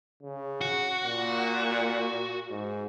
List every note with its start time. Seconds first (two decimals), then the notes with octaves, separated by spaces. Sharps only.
0.23 C#3
0.61 F#4
1.05 A#2
2.50 G#2